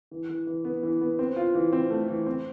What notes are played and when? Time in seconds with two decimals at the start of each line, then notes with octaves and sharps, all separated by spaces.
0.11 E3
0.29 E3
0.47 E3
0.65 B3
0.83 E3
1.01 B3
1.19 C4
1.36 F4
1.54 E3
1.73 C4
1.90 A3
2.08 E3
2.26 C4